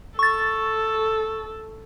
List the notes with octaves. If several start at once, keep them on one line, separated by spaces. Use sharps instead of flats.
A4 C#6 A6